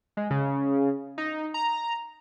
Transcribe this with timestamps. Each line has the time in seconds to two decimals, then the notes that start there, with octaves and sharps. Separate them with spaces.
0.17 G#3
0.31 C#3
1.18 D#4
1.54 A#5